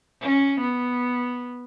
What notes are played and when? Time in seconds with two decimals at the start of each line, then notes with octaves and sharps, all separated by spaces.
0.22 C#4
0.60 B3